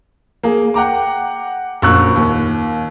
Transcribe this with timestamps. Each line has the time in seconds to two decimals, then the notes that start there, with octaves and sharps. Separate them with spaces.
0.43 A#3 G#4
0.74 F#5 G5 A#5 D6
1.82 A#1 F#2 C#6 E6 F#6
2.16 D#2